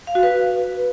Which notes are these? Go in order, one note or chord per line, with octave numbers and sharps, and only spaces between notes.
F5
F#4
B4